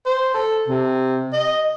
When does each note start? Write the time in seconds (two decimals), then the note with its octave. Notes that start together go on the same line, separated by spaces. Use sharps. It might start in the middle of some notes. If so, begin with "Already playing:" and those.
0.06 C5
0.34 A4
0.68 C3
1.33 D#5